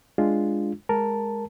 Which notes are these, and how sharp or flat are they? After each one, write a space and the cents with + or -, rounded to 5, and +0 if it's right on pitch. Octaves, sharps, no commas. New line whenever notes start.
G#3 +0 D4 +0 F4 -5
G#3 +0 A#4 +0 A5 +0